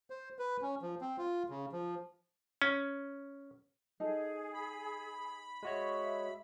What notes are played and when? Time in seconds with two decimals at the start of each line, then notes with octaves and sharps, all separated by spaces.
0.10 C5
0.39 B4
0.62 C#4
0.82 F3
1.01 C4
1.18 F4
1.49 C#3
1.72 F3
2.62 C#4
4.00 D#4 G#4 A4
4.54 B5
5.63 G#3 F#4 C#5 E5